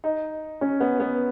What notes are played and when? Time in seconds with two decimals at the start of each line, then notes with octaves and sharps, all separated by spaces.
0.04 D#4
0.61 C#4
0.80 B3
1.00 B3